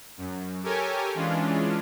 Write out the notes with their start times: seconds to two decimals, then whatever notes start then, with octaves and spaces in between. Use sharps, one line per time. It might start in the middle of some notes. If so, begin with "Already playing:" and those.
0.18 F#2
0.63 G4 A4 A#4 C#5 G#5
1.15 E3 G#3 C#4 D4 F4